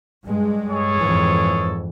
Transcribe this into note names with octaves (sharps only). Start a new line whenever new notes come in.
G2 G#3
G#4 A4 C#5
F2 G#2 E3